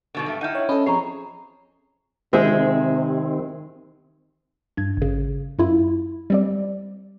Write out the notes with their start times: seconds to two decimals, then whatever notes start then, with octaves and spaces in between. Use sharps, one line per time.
0.15 G#2 B2 D3
0.26 G2 A3
0.41 D#4 E4 F#5 G5 F6 G6 D#7
0.55 C#5 F#5 G5
0.69 C#4 A4 D#5 B5
0.86 F3 C4 G#4 C#5 A#5 C7
2.33 C3 D#3 G#3 C4 G#4 C5 E5
4.77 G2 G#6
4.97 G#1 C#3
5.59 F#2 E4 F4
6.30 G3 C4 D5